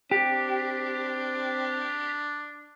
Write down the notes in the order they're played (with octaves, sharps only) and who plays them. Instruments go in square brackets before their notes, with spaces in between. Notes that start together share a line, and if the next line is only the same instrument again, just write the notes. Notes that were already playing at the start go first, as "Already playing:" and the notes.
[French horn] C4 [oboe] D4 [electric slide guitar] G4